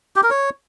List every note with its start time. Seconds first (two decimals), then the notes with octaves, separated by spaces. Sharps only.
0.16 G4
0.23 A#4
0.31 C#5